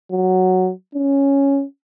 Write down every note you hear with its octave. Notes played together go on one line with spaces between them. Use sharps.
F#3
C#4